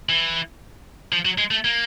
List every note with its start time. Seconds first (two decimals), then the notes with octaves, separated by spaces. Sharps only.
0.09 E3
1.12 F3
1.25 F#3
1.38 G#3
1.51 A3
1.65 A#3